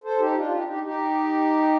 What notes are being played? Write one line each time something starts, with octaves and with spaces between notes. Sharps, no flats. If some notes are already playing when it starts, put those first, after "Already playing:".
A4 C5
D#4 G4
D4 F4
D#4 G4
D#4 G4
D#4 G4